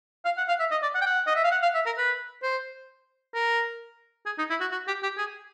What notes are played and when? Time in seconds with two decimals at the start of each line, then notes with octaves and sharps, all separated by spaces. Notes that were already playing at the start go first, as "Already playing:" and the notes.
0.25 F5
0.37 F#5
0.48 F5
0.60 E5
0.71 D#5
0.82 D5
0.95 F#5
1.01 G5
1.06 F#5
1.27 D#5
1.36 E5
1.44 F5
1.51 F#5
1.63 F5
1.74 E5
1.86 A#4
1.97 B4
2.43 C5
3.34 A#4
4.26 G#4
4.38 D#4
4.50 E4
4.61 F#4
4.72 F#4
4.87 G4
5.03 G4
5.17 G#4